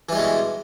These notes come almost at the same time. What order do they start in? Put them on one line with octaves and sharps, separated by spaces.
E3 G3 G#3 B2